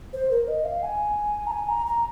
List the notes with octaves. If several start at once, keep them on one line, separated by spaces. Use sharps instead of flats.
C5
A#4
D#5
F5
G#5
A#5
G#5
A#5
A#5